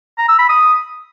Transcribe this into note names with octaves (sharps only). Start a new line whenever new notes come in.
A#5
E6
B5
D#6